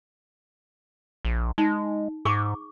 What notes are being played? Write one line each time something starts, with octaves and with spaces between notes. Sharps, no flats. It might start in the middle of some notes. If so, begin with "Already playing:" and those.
A#1
G#3 D#4
G#2 G#4 C#6 D6